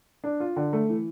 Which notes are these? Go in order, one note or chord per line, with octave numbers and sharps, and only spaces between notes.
D4
F4
D3
A3
E3